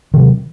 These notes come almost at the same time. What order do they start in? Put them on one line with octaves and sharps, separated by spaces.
D#3 C3 F#3